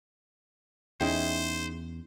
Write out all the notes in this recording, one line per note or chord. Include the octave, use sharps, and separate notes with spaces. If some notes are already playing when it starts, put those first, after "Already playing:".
E2 C#4 D#4 E4 G#4 C5 D#5 G5